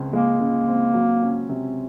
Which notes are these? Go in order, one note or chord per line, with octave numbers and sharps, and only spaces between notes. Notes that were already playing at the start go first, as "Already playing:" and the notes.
Already playing: C#2 C#3 C4
G#3 A#3
C#3
C4
F#3
C#4
C3